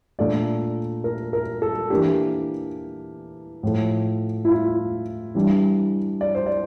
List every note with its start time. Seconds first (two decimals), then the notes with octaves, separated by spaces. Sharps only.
0.19 A#2 A3 D4 D5
1.04 A#4
1.33 A#4
1.62 A4
1.90 E3 A#3 D4 G4
3.63 A2 F3 A3
4.45 E4
4.49 F4
5.35 E3 G3 D4
6.21 D5
6.35 C5
6.46 D5